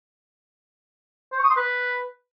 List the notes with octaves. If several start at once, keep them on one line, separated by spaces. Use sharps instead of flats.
C5
C#6
D#6
C6
B4